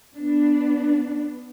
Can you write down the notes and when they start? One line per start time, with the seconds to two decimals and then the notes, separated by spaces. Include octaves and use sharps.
0.15 B3 D4